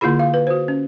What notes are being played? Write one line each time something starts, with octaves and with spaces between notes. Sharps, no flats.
D3 A#3 E4 F4 G#4 B5
F5
B4
F#4 C5
C#4